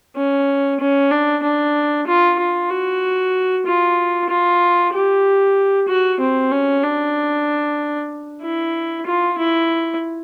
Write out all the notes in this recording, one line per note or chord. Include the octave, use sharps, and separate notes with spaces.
C#4
C#4
D4
D4
F4
F4
F#4
F4
F4
G4
F#4
C4
C#4
D4
E4
F4
E4